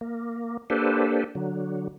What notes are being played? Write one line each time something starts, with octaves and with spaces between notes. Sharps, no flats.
A#3
A#3 D4 G4 A4 B4 C5
D3 F#3